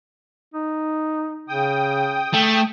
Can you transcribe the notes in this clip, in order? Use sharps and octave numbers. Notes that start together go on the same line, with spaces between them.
D#4
C#3 G5 D#6
A3